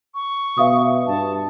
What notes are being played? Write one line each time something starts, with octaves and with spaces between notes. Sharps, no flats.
C#6
B2 E5 F5 D#6
G2 A5